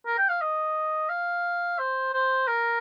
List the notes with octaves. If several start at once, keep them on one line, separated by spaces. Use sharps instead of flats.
A#4
G5
F5
D#5
F5
C5
C5
A#4